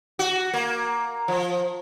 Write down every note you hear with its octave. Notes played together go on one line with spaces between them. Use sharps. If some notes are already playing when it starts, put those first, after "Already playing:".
F#4
A#3
F3